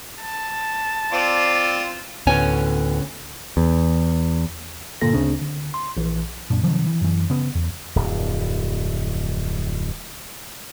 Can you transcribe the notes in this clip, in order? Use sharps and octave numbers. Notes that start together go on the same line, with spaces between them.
A5
C4 F4 C5 D5
D2 A2 B3 C#4 C#5 G#5
E2
G2 A#2 D3 A#3 A4 A#6
D2 C#3 C4 D4
D3
C6
A#1 E3
F#2 A#2 D4
C3 D#3 F3 F#3
E3
F#2 E3
C#3 B3
E2
D1 F2